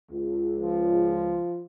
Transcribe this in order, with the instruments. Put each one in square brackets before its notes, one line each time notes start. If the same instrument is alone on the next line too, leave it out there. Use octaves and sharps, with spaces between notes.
[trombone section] C#2
[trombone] F3